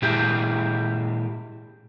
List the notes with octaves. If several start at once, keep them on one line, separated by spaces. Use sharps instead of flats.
A#2 G#3 E4 G4